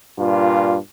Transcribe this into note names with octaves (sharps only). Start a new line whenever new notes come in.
G2 A#2 F4